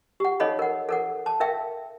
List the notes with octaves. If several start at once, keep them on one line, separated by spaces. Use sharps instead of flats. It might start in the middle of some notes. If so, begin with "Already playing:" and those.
G4 F#5
D#4 A4 C#5 D#5 F5 B5
A#4 F#5
A4 A#4 F#5
A5
A#4 E5 F5 G5